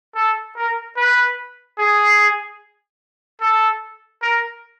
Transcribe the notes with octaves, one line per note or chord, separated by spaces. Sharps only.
A4
A#4
B4
G#4
A4
A#4